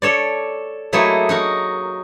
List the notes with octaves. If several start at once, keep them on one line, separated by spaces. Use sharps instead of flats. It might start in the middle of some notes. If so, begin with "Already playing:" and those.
A4 C#5 D5
F#3 A3 A#3 D#4 E4 G#4
D#4 F#4 A#4